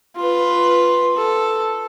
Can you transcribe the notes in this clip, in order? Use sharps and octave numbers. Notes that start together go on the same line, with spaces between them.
F4 B4
A4